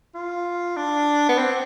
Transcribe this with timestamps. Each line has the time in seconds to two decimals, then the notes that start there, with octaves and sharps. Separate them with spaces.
0.15 F4
0.77 D4
1.29 B3
1.38 C4